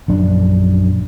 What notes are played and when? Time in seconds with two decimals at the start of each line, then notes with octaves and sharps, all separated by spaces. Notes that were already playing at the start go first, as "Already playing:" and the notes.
0.08 A#1 F#2 D4